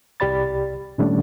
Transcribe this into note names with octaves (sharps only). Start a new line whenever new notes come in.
C2 G4 D5 B5 A6
A#2 D#3 G3 A3 C#4 D4